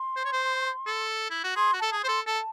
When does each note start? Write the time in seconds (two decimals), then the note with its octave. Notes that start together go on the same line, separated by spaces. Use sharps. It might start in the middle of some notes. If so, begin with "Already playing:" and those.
Already playing: C6
0.16 C5
0.25 C#5
0.32 C5
0.86 A4
1.30 E4
1.44 F#4
1.56 G#4 C6
1.73 F#4
1.80 A4 A5
1.92 G#4
2.03 C5 C6
2.08 A4
2.26 A4 A5